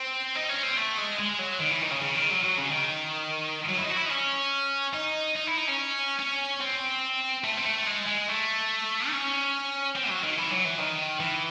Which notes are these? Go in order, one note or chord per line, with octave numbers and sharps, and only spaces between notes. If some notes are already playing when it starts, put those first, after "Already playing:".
Already playing: C4
D#4
C#4
C4
A3
G#3
G#3
F#3
D#3
E3
D#3
C#3
C#3
D#3
F#3
F#3
C#3
D#3
F#3
E4
D#4
F#4
E4
D#4
C#4
D#4
D#4
E4
D#4
C#4
C#4
C4
A3
C4
A3
G#3
G#3
A3
D#4
C#4
C4
F#3
D#3
E3
F#3
E3
D#3
E3